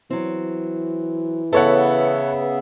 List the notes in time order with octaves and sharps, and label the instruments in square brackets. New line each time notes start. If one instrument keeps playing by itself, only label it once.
[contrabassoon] E3 [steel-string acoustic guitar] F#3 C4
[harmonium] C#3 B3 E5 [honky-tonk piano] A4 C#5 F#5 [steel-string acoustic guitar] B4